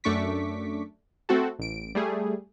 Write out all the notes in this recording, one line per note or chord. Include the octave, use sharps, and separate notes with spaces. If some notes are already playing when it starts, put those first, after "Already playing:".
F#2 A3 D4 C#6 D6 B6
A3 C4 F#4 A4
A1 D7
G3 A3 G#4